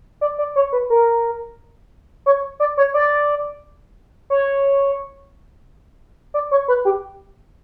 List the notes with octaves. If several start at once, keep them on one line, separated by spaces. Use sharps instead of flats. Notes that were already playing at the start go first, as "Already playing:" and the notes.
D5
D5
C#5
B4
A#4
C#5
D5
C#5
D5
C#5
D5
C#5
B4
G4